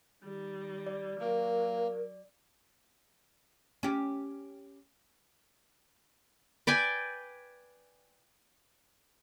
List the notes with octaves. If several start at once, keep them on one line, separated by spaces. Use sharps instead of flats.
D#3 G3
D5
F#3 A#3 A#4
C#4 G4
B4 D5 G5 G#5